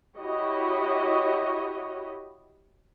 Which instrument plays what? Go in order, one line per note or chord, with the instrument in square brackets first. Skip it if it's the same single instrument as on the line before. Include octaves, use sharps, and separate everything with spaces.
[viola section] E4 F#4 G4 C#5 D#5